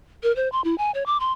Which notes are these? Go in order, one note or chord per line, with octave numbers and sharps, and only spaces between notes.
A#4
C5
C6
E4
G#5
C#5
D6
C6